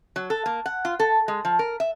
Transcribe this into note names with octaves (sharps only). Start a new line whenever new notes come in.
F#3
A4
A#3
F#5
F4
A4
G#3
F3
A#4
E5